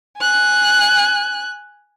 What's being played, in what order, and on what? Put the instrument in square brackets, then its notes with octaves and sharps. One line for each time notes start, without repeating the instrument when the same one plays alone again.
[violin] G#5 F#6